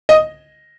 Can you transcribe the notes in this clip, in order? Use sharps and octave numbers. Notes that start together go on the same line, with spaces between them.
D#5